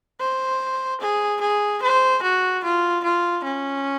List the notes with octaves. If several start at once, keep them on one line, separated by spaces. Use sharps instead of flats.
C5
G#4
G#4
C5
F#4
F4
F4
C#4